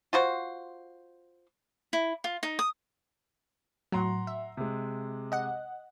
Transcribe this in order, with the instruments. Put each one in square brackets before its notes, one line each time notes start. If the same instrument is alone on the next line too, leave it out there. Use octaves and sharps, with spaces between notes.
[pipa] F4 F#4 C5
[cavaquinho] E4
F4
D#4
D#6
[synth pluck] A2 F#3 [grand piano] F#5 A#5 C6
[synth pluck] E5
[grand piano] C3 G#3
[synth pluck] D#5 F#5